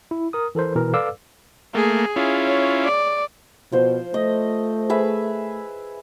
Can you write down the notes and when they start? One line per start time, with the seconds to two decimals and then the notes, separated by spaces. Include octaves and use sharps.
0.11 E4
0.33 A#4 D#6
0.55 E3 A4 A#4 C5
0.75 B2 E3 A#4
0.93 A4 B4 D5 F5 D6 E6
1.75 A3 A#3 G#4
2.16 C#4 E4 F4
2.47 C#5
2.84 D5
3.72 B2 F3 C5
4.14 A3 D#5
4.89 G#4 B4 E5